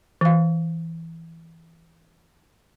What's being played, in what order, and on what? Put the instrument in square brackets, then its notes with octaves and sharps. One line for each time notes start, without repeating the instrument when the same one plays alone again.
[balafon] E3 F5